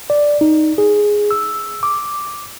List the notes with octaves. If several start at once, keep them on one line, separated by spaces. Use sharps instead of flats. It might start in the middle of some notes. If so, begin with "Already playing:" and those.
D5
D#4
G#4
E6
D6